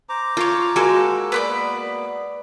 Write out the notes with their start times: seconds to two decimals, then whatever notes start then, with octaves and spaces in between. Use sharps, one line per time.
0.09 C5 A#5 D6
0.37 F4 A4 C#5
0.76 G#3 A#3 F#4 A4 G#5
1.32 A#3 B3 B4 C5 D5